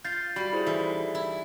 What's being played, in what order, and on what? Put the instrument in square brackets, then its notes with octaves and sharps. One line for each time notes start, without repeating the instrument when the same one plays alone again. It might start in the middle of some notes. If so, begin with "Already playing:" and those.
[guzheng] F4 [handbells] G6 A6 C7
[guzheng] G3 [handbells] F#4 B5 A6
[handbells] E4 G#4 C5
[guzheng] E3 [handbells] D#4 A4 E5
[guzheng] E4